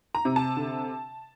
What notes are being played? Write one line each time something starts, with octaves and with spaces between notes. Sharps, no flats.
A#5
C3
A5
D3